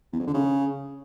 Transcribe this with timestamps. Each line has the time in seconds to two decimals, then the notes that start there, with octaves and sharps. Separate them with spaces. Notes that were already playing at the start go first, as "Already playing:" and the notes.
0.13 E2
0.20 F2
0.27 D3
0.34 C#3